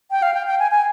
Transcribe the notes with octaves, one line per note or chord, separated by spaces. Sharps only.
G5
F5
G5
G5
G#5
G#5